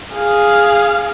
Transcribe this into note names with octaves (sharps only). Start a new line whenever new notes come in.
G#4 F5